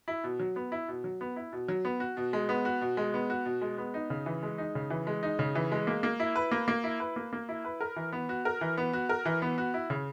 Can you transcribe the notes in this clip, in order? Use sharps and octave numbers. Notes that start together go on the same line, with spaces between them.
E4
B2
F#3
B3
E4
B2
F#3
B3
E4
B2
F#3
B3
F#4
B2
G#3
B3
F#4
B2
G#3
B3
F#4
B2
G#3
B3
D#4
C#3
E3
G#3
D#4
C#3
E3
G#3
D#4
C#3
E3
G#3
A#3
A#3
E4
B4
A#3
A#3
E4
B4
A#3
A#3
E4
B4
A#4
E3
B3
F#4
A#4
E3
B3
F#4
A#4
E3
B3
F#4
E4
C#3